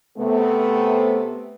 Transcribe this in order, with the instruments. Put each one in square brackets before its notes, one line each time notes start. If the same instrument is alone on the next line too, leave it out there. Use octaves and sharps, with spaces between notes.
[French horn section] C3 A3 B3